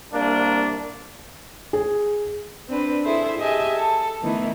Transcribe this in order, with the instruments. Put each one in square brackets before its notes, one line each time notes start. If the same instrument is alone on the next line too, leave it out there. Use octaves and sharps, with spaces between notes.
[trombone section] C2 A#3 D4
[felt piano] G#4
[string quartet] C4 D4 B4
E4 G#4 A4 C5 E5
G4 G#4 D#5 E5 G#5 A5
A4
D#3 E3 A3 B3 D#4 E4